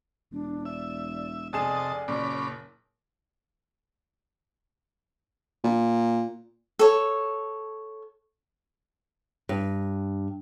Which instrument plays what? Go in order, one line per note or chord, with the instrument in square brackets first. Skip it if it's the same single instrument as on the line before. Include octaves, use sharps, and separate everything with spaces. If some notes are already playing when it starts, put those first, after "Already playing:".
[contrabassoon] E1 [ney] D4
[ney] D5 [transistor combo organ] E5
[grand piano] F1 G#4 E7 [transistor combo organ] C3 D#5 A5 [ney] D5
[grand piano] F#1 A#2 [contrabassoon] F#2 [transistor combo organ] C#4 B5 D6
[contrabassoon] A#2
[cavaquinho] A4 C#5
[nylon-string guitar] G2